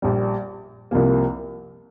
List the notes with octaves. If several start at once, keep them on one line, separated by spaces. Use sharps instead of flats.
A#1 A#2 G3
C2 C3 F3 A#3